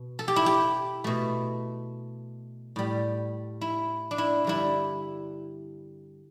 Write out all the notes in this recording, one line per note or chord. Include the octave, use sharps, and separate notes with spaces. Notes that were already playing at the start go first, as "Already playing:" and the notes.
Already playing: B2
A4
G4
E4
G4
B2 A3
A2 G3
E4
D4
E4
G2 D3 G3 E4